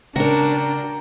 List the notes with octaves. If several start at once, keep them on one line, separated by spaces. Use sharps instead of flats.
C#3 D4 F#4 A#4 G5 A#5